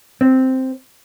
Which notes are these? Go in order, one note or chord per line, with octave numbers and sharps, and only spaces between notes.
C4